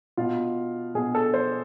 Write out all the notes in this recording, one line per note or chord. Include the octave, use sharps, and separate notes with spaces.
B2 F4
B2 G#4
A4
C5